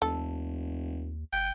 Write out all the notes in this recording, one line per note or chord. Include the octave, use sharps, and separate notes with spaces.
F1 D#2 A4
G1 G5